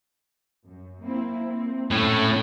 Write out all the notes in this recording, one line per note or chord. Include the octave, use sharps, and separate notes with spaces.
F#2
A#3 C4 E4
A#3 C4
A2 C#4